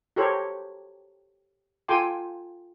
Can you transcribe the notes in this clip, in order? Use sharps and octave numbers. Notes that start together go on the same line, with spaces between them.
F#4 G4 A4 A#4 C5 C#5
F4 A4 G5 G#5 C6 D6